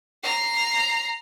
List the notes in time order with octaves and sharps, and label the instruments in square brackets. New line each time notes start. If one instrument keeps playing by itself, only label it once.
[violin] A#5 C7